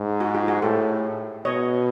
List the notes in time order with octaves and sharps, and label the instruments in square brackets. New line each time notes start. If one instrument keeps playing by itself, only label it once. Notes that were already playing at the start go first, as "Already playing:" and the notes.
Already playing: [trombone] G#2
[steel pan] F#4 G#4
F4 G4
F#4 G#4
[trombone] A2 [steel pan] G4 A4
[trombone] B2 [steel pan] C#5 D#5